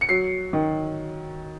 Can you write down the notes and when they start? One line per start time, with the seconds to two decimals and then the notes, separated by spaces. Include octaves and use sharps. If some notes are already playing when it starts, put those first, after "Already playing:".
0.01 C#7
0.09 F#3 C7
0.53 D#3